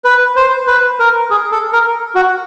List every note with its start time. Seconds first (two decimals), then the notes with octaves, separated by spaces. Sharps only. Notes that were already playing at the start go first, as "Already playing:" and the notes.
0.04 B4
0.36 C5
0.67 B4
0.99 A#4
1.30 G#4
1.52 A4
1.72 A#4
2.15 F#4